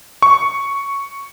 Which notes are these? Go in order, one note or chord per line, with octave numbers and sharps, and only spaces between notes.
C#6